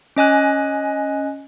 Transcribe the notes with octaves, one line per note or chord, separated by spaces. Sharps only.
C#4 D#5 G#5 F#6